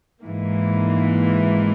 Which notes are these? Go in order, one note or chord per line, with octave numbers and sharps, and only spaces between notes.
G#1 G#2 E3 A#3